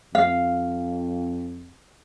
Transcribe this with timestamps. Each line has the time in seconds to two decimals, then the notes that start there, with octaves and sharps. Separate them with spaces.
0.15 F2 F5